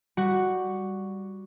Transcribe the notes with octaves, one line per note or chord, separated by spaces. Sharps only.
G3 F#4 F#5